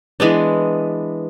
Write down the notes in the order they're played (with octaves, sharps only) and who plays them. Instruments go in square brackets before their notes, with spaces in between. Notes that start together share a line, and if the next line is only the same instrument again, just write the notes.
[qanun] E3 G#3 B3 D4